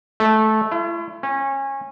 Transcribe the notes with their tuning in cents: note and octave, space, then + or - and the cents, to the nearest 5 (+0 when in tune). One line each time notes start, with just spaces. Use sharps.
A3 -15
E4 +45
C#4 -25